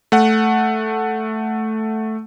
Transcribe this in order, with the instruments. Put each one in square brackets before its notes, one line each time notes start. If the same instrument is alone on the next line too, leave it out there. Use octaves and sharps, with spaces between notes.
[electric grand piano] A3 F#5